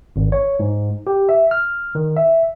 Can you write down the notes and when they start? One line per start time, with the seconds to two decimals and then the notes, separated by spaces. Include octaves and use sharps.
0.16 G#1
0.32 C#5
0.60 G#2
1.07 G4
1.29 E5
1.51 F6
1.95 D#3
2.17 E5